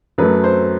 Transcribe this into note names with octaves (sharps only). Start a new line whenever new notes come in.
F#2 F#3 A3 B4
C5